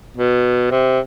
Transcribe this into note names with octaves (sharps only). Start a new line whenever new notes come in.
B2
C3